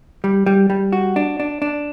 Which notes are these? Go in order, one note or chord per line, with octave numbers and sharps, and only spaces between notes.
G3
G3
G3
F#4
D4
D4
D4